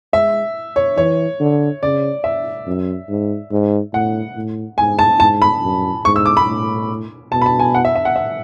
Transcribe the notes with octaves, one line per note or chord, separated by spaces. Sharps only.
G#3 E5
C#5
E3 C#5
D3
C#3 D5
E5
F#2
G#2
G#2
A2 F#5
A2
G#2 G#5
A5
G#2 A5
B5
F#2
G#2 C#6
E6
D6
B5
A2
B2 A5
B5
A5
G#5
F#5
E5
E5
F#5
E5